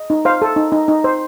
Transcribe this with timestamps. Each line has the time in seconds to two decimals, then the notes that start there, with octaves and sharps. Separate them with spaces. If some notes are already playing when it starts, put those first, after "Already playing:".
Already playing: D#5
0.10 D#4
0.25 C5 F5
0.42 A4
0.56 D#4
0.72 D#4
0.88 D#4
1.04 C5